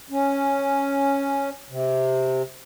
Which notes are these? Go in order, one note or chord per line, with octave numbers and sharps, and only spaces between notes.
C#4
C3